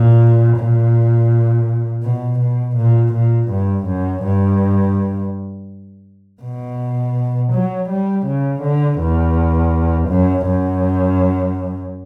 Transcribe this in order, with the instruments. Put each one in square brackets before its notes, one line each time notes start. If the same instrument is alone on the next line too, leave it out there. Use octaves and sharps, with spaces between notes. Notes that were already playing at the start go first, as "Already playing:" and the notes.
Already playing: [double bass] A#2
A#2
B2
B2
A#2
A#2
G2
F#2
G2
B2
F#3
G3
C#3
D3
E2
F#2
F#2